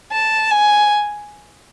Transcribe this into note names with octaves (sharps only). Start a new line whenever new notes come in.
A5
G#5